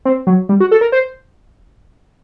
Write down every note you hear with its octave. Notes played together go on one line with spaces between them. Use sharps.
C4
F#3
G3
F#4
A4
A#4
C5